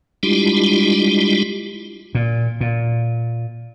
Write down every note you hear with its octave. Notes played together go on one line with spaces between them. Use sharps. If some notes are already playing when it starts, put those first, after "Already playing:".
G3 G#3 D4 E4 F4 G4
A#2
A#2